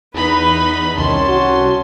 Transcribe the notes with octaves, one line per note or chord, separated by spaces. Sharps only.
E2 D#4 B4 B5
C2 D#3 C#4 A5 C6
F#4